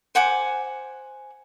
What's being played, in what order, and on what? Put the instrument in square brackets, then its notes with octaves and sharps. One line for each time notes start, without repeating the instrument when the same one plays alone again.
[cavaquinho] C5 F#5 G#5 D6